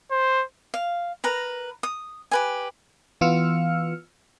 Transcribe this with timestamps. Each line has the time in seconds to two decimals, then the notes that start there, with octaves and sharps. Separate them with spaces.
0.12 C5
0.74 F5
1.24 A#4 B4 A#5
1.83 D#6
2.31 G4 B4 G#5
3.21 E3 B3 F4 E6 F6 C#7